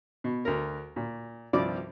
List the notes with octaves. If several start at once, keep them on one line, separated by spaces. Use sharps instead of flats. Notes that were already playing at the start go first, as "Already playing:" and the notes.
B2
D2 A#4
A#2
C2 G2 F3 D5 D6